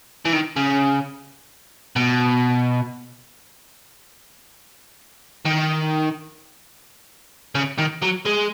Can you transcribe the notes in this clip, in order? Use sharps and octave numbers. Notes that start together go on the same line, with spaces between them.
E3
D#3
C#3
B2
D#3
C#3
D#3
F#3
G#3